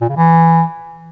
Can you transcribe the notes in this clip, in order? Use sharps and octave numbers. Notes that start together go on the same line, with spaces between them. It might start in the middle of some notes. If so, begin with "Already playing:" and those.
A#2
C#3
E3